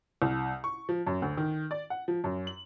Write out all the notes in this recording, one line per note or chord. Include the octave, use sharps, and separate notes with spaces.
C2
C#6
F3
F#2
D2
D#3
D5
F#5
F3
F#2
F#7